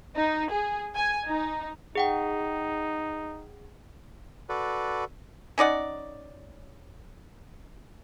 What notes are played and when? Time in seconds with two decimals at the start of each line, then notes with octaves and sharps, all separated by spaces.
0.15 D#4
0.50 G#4
0.95 G#5
1.28 D#4
1.95 D#4 G#4 F#5 G5
4.49 F#4 A4 B4 D5
5.58 C#4 D#4 D5 F#5